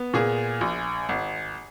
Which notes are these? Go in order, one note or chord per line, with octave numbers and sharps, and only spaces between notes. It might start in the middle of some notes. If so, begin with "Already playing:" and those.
Already playing: B3
A#2 G#4
A#1
G#1